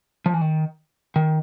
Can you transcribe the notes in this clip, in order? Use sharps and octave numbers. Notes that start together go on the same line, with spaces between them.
F3
E3
D#3
D#3